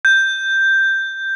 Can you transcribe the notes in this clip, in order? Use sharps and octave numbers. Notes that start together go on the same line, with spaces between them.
G6